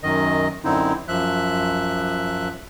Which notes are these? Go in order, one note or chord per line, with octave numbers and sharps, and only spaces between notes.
F#2 D#3 D#5
F#2 D3 C4 D#4 E4
F#2 F3 E5 F#6